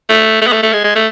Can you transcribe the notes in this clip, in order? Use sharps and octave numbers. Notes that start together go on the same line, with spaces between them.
A3
A3
B3
A3
A3
G#3
G#3
A3